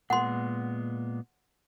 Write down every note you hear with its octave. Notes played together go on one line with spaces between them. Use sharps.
A#2 G#3 B3 F#5 C6